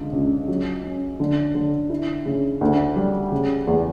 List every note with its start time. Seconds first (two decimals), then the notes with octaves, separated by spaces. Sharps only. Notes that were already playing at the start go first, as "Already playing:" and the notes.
Already playing: C#2 D3
0.13 C#2
0.48 F#3
0.84 C#4
1.20 D3
1.55 D3
1.90 E4
2.26 C#3
2.61 D2
2.96 G3
3.32 C#3
3.67 E2